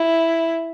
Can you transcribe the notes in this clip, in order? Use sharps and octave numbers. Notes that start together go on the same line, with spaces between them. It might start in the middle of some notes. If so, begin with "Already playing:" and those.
Already playing: E4